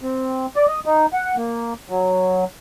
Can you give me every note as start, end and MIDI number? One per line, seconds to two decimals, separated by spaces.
0.02 0.46 60
0.56 0.66 74
0.68 0.80 75
0.85 1.06 63
1.13 1.36 78
1.37 1.73 58
1.90 2.44 54